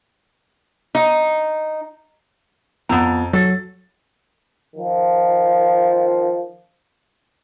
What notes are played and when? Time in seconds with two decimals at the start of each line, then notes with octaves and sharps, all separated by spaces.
0.95 D#4
2.89 F2 B3 A#5 E6
3.33 F#3 A4 A6
4.76 D#3 F3